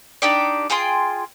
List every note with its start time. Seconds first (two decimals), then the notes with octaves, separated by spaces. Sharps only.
0.22 D4 D#4 G4 D5
0.70 F4 G#4 G5 C6